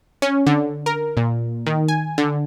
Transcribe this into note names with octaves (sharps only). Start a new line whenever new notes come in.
C#4
D3
A#4
A#2
D#3
G#5
D3